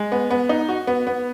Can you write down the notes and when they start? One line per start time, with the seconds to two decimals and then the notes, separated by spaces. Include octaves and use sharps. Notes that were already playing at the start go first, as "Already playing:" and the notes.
Already playing: G#3
0.12 B3
0.31 B3
0.49 D#4
0.69 F#4
0.87 B3
1.07 B3